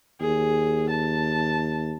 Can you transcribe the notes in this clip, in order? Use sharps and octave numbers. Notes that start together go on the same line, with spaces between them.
D#2 G#4
A5